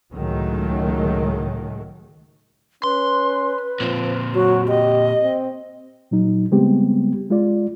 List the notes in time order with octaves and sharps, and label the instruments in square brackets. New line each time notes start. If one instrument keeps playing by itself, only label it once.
[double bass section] C#2 A2 D#3 F#3 G#3 A3
[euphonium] C#4 [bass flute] B4 [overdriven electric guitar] C6
[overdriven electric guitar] A#2 C4 [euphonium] F3
[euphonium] F#3 [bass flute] F#4
[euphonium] G4 [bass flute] D#5
[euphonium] C4
[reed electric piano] A#2 F#3 D#4
C#3 G3 G#3 B3 C4 G4
G#3 F4 D5